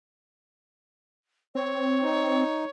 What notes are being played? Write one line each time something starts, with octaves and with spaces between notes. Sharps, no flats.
C4 C#5
D#4